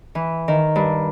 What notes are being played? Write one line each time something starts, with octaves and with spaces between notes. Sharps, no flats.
E3
D#3
G2